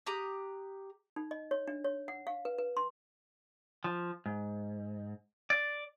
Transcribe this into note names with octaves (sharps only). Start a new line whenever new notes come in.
G4 A#5 D#6 F#6
D#4
D#5
C#5
D4
C#5
F#5
F5
B4
B4
C6
F3
G#2
D5